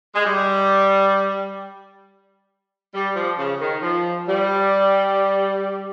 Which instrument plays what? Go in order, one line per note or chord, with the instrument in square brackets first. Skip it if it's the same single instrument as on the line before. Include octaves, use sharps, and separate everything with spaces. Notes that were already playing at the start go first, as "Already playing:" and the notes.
[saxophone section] G#3
G3
G3
F3
C#3
D#3
F3
G3